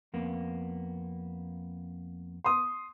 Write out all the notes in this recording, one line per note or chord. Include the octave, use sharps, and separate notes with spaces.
F2 A#3 B3
C6 D#6